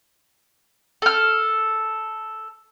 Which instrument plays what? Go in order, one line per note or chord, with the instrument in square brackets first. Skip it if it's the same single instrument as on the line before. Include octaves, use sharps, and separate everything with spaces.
[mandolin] A4 F6